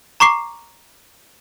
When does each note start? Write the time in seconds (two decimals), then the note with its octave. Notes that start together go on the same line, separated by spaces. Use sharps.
0.20 A#5 C#6 D6 C7